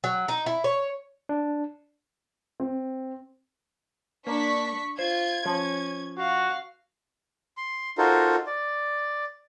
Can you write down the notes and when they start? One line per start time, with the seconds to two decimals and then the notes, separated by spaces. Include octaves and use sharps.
0.04 F#3
0.28 D#4
0.46 E4
0.64 C#5
1.29 D4
2.60 C4
4.27 A#3 D4 C#6 B6
4.99 F4 C5 G#6
5.46 F3 C#4
6.18 F#4 F5
7.57 C6
7.98 D#4 F4 F#4 A4 A#4 C5
8.47 D5